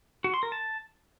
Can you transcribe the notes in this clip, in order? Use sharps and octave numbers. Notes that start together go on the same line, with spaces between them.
F#4
C6
A#4
A5